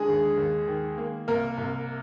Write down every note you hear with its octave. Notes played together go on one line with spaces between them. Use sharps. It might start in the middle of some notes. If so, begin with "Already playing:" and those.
Already playing: D3 G#3 G#4
D#2
D#2
D#3
A#3
C2 A#3 A#4
C2